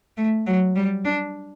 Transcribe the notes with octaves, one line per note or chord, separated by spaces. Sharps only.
A3
F#3
G3
D4